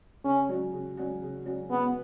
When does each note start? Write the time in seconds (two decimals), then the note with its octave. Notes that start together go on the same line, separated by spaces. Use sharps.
0.24 C#3 C#4
0.49 F#3 C#4 F#4
0.73 C#3
0.97 F#3 C#4 F#4
1.22 C#3
1.46 F#3 C#4 F#4
1.70 C#3 B3